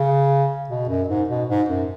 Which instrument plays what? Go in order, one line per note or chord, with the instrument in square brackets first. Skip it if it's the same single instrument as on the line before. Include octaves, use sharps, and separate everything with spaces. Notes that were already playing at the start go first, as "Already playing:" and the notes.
Already playing: [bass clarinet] C#3
B2
F#2
G#2
B2
G#2
F#2